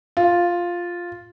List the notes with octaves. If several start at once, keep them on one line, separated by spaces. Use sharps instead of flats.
F4